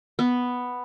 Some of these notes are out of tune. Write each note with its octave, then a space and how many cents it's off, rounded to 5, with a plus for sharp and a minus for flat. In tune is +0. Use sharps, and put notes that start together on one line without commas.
B3 +0